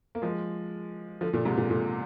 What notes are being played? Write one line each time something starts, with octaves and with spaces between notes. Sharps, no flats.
A#3
F3 G#3
D3 F3
A#2 D3
G#2 C3
A#2 D3
A#2 D3